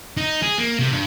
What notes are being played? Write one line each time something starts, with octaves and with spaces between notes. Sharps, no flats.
D#4
G#4
A#3
C3
G2